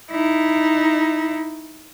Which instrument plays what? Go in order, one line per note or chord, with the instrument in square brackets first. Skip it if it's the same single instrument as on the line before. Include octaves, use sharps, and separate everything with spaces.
[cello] D#4 E4